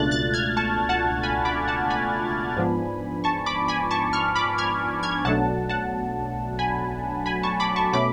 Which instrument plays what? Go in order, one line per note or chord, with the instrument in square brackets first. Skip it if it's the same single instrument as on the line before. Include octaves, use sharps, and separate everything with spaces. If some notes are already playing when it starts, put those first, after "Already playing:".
Already playing: [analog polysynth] C#2 B2 A3 D4 F4 F#6 A6
F#6 A6
F6 G#6
A5 C#6
F#5 A5
G#5 B5
B5 D6
F#5 A5
G#5 B5
G#2 F3 B3 D4
A5 C#6
B5 D6
G#5 B5
A5 C#6
C#6 F6
B5 D6
F6 G#6
F6 G#6
B1 B2 F#3 A3 D4 F#5 A5
F#5 A5
G#5 B5
G#5 B5
A5 C#6
B5 D6
A5 C#6
B2 A3 C#4 B5 D6